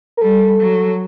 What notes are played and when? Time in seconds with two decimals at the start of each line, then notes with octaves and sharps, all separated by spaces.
0.17 A#4
0.21 G3 A4
0.60 F#3